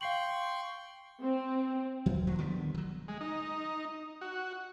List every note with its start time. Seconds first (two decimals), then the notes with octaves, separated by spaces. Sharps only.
0.01 F5 G5 C6 C#6 C7 F#7
1.22 C4
2.06 D1 D#2 F#3
2.27 F3 F#3 A#3
2.39 D3 D#3 G3 B3
2.74 D#3 F#3
3.08 G#3
3.21 D#4
4.21 F#4